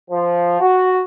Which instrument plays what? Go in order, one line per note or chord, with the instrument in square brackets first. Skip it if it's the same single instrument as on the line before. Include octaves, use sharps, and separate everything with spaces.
[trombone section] F3
F#4